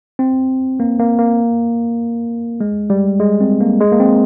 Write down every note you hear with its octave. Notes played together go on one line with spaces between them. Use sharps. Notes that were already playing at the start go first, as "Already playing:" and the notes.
C4
A#3
A#3
A#3
G#3
G3
G#3
C4
A#3
G#3
A#3
C4